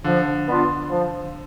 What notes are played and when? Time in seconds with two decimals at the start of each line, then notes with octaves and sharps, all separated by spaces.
0.04 D3 F3
0.47 B3 D4 F4
0.89 F3